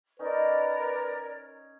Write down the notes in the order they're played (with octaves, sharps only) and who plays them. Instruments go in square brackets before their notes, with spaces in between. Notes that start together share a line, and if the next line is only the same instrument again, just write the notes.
[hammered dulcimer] C#4 D#4 [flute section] A#4 D5 [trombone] B4